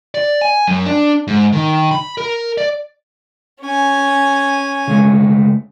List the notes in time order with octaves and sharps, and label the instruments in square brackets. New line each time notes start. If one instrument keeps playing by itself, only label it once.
[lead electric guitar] D5
G#5
F#2
D4
G#2
D#3
B5
A#4
D5
[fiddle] C#4 G#5
[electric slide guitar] C#3 G#3 A3